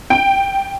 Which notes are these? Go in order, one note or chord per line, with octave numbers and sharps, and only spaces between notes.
G5